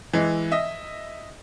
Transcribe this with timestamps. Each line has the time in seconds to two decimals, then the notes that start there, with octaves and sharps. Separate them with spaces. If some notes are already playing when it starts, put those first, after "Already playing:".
0.13 E3 G#3
0.52 D#5 E5